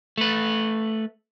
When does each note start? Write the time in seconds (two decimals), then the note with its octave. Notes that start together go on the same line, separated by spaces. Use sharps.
0.18 A3 B4